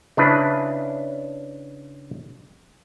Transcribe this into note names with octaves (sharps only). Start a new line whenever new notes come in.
C#3 D4 E4 B4